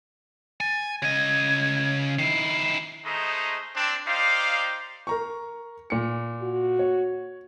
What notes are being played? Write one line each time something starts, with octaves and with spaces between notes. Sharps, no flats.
G#5 A6
C#3 D#5 G#6
D#3 E4 C7
G#3 A3 D#4 C5 D#5 A#5
C4 D4
D#4 G4 C5 D5 F5
A#4 A#5 C#6
A#2 C#7
F#4
C#5